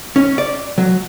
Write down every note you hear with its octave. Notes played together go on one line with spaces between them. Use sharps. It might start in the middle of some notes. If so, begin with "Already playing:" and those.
C#4
D5
F#3